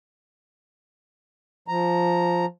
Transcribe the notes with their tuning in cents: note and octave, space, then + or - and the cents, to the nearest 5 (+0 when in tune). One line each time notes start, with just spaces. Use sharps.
F3 +0 A#5 +0